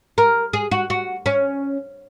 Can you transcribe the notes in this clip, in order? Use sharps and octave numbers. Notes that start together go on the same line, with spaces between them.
A#4
G#4
F#4
F#4
C#4